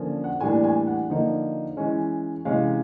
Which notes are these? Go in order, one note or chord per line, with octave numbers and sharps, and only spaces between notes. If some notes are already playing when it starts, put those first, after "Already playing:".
Already playing: D3 F3 A#3 C#4
F#5
A2 E3 G3 A#3 D4 G#5
G#5
F#5
D3 F3 A#3 D#4
E3 G#3 C#4
C3 E3 G#3 C#4 F5